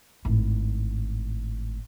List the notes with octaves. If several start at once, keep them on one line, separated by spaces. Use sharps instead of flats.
G#1 A2